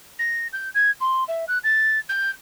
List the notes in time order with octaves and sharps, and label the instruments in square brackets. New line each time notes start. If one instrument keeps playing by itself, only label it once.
[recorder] A#6
G6
G#6
C6
E5
F#6
A6
G6